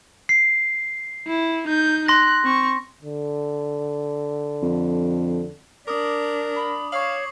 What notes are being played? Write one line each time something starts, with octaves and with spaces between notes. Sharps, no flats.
C7
E4
D#4 G6
C6 F#6 A#6
C4 C#6
D3
F2
D4 A#4 D6 D#6
B5
C#5 F5 C#6 C7 F#7